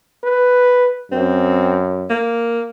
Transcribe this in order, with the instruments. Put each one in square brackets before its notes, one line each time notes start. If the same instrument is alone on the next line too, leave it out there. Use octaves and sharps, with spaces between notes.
[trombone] B4
[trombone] F#2 [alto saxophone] C4
[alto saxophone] A#3